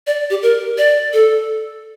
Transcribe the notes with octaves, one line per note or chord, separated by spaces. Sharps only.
D5
G4
A#4
D5
A4